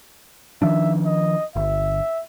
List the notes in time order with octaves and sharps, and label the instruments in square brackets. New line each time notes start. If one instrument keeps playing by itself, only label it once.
[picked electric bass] D#3 F3 D4 [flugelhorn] E5
[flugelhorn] D#5
[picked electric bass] G1 [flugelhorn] E5